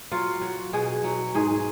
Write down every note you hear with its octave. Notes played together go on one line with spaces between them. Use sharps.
F#3 F4
F#3
B2 G#4
F#3
G#2 G#4